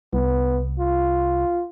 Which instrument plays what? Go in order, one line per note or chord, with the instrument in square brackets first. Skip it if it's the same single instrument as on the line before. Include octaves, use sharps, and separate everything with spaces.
[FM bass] C2 [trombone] B3
[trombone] F4